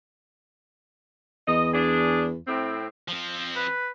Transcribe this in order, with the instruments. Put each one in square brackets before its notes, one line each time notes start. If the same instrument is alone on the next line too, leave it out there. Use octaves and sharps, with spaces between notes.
[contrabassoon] E2 [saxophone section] D#5
[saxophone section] D4 G#4
A2 C4
[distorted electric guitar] F3 C4
[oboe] B4